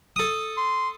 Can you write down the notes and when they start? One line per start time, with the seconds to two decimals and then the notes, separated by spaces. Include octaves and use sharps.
0.16 A4 D#6
0.57 C6